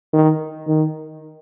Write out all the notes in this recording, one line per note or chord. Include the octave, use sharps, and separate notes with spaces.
D#3
D#3